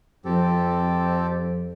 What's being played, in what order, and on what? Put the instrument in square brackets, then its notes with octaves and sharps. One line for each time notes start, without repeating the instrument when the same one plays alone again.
[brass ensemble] F2 [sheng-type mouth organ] C4 G4 A4